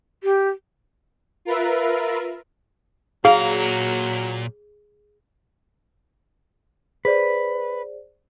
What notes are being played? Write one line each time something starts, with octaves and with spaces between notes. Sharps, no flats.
G4
F4 A#4 B4 E5
A#2 F#3 G#4 F5 A#5
G#4 B4 C5 D5